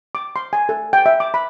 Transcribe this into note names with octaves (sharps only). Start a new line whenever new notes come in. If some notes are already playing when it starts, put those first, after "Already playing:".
D6
C6
G#5
A4
G5
E5
D6
B5